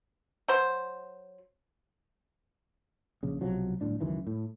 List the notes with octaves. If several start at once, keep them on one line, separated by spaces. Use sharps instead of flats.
F#3 C5
A#1 C#3
B1 C3 F3 F#3
D1 G1 A2 D4
C#2 F#2 D#3 E3
A2